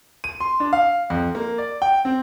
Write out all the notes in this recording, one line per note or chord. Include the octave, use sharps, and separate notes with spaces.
D#7
C6
D4
F5
F2
A#3
D5
G5
C4